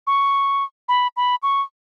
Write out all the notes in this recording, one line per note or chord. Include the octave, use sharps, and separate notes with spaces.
C#6
B5
B5
C#6